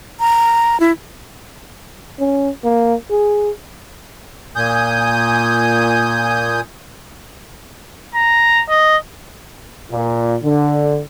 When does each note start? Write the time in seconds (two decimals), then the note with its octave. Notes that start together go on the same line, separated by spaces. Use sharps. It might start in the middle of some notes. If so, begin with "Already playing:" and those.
0.20 A#5
0.80 E4
2.20 C#4
2.64 A#3
3.10 G#4
4.56 A#2 G#5 D#6 G6
8.15 A#5
8.69 D#5
9.91 A#2
10.43 D3